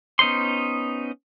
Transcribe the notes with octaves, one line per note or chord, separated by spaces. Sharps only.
B3 C#4 D#4 C5 C6